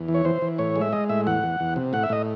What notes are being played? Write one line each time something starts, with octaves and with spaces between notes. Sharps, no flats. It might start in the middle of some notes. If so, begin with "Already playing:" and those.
Already playing: E2
E3
C#5
E3 C5
E3
A2 C#5
G#3
E5
G#3 D#5
A2 E5
E2 F#5
E2
E2
C3
A2 F#5
E5
A2 D#5